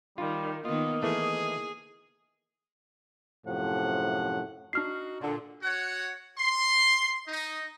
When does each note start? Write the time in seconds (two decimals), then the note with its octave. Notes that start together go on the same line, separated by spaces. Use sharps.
0.18 D#3 G3 F4
0.65 D#3 A#3 B3 F4 D#5
1.03 D#3 E3 A3 G#4
3.47 F#2 A2 C3 F3 F#5
4.73 D4 D#4 F#4 F6 C7
5.21 A#2 D3
5.62 F#4 C#5 F#5
6.38 C6
7.28 D#4 D#5